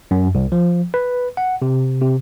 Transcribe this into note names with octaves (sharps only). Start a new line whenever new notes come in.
F#2
C2
F3
B4
F#5
C3
C3